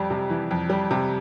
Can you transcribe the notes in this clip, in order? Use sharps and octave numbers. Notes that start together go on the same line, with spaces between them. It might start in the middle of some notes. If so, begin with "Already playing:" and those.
Already playing: F2 G3 D5
C3
E3
F2
G3
C3